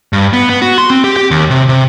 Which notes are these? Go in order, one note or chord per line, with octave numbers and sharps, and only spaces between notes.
G2
B3
B3
F#4
C6
C4
G4
G4
D#2
C3
C3